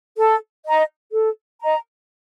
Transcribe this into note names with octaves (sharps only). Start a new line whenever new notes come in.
A4
D#5 A#5
A4
D#5 A#5